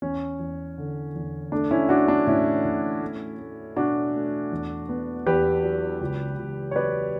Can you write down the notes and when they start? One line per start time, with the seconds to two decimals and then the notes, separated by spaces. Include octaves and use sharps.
0.02 E2 C#4
0.39 E2
0.78 D3
1.15 E2
1.52 A3 D4
1.71 C#4 E4
1.89 A3 D4 F#4
2.08 D4
2.27 A2 C#4 E4
2.65 A2
3.01 A3
3.39 A3
3.76 B2 D4 F#4
4.14 A3
4.52 E2
4.89 B3
5.27 E2 G4 B4
5.63 F#3
6.01 C#2
6.38 C#2
6.71 C#5
6.76 F#3 B4 D5